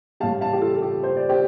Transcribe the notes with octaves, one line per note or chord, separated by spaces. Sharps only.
A2 G3 F5 A5
F5 A5
G4
F4 A4
A4
G4
C5
D5
G4 C5